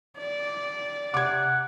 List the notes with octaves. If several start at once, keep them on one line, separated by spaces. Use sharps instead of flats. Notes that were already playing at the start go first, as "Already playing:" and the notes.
D5
C3 F#5 D6 G#6